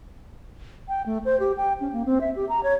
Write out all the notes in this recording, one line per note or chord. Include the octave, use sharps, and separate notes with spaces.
G5
A3
C5
G4
G5
C#4
A#3
C4
E5
G4
A#5
C#5